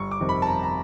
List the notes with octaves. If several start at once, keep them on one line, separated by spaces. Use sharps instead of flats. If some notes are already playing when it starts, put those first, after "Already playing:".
Already playing: G1 C#6
D6
F2 C3 D#3
B5
A5
G1 A#5
A#5